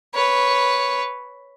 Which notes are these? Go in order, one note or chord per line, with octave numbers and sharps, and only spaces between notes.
B4 C#5